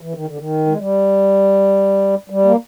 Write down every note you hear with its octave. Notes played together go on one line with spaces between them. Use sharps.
E3
D#3
D3
D#3
G#3
G3
G3
A#3